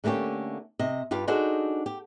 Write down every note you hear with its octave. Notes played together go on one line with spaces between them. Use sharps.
D3 A3 A#3 C#4 G4
C3 D#5
G2 F4 G4 F5
D4 D#4 F#4 G#4 A4 C5
G4